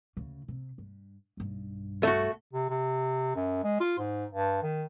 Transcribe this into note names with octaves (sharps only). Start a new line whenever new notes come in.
D2 C#3
C3
G2
B1 G2
A3 F#4
C3
C3
F#2
G#3
F4
G#2
G2
D#3